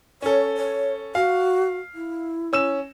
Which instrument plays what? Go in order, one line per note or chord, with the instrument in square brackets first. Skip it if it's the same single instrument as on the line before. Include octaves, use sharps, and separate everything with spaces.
[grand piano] C#4 A4 [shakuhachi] C#5
[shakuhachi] C#5
[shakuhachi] F#4 [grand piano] F5
[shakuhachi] E4
[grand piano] C#4 E6 E7